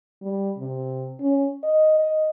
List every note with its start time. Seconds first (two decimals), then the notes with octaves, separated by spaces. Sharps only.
0.22 G3
0.58 C3
1.20 C#4
1.63 D#5
1.99 D#5